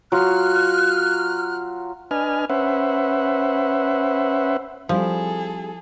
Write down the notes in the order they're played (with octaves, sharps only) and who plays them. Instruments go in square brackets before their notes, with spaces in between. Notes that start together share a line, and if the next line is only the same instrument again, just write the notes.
[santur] F#3 F4 [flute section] F6 F#6
[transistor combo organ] D4 B4 D#5 G#5 F6
C#4 B4 C5 E5 F#5
[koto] F3 [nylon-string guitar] G3 C4 E4 [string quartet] G#4 A4